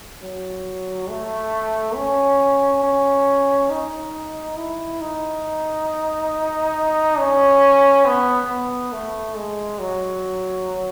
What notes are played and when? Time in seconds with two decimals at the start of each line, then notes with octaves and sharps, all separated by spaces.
0.22 F#3
1.09 A3
1.96 C#4
2.84 C#4
3.70 D#4
4.57 E4
5.01 D#4
7.18 C#4
8.05 B3
8.49 B3
8.92 A3
9.36 G#3
9.79 F#3